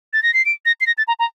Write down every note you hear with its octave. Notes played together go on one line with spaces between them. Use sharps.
A6
A#6
C7
D7
A#6
C7
A#6
A6
A#5
A#5